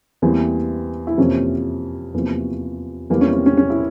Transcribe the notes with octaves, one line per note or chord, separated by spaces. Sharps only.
E2 E3 G3 A#3 C4
E4
F2 C3 E3 A#3 C#4
E2 C3 F3 A#3
E2 E3 G3 A#3
C#4
C4
C#4
C#4
E4